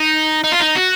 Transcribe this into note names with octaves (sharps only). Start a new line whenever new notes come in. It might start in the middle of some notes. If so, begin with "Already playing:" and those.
Already playing: D#4
D#4
F4
D#4
F#4